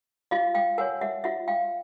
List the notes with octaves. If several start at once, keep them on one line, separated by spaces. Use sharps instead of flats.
F4 D#5 F5
F5 G5
A#4 C#5 F#5 G#5
E5 F#5
F4 E5 F#5
F5 G5